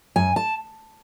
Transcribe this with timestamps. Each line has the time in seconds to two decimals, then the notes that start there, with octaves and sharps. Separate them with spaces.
0.16 F#2 G#5
0.36 A5